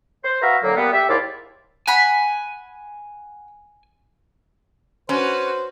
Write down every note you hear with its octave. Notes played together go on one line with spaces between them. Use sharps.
C5
F#4 B4 E5 F5 A#5
A2 D3 F#3 A#3
G3 A#3 B3
G4 E5
D#2 G#2 E4 F4 D5
F#5 G#5 B5
C#4 F#4 B4 C5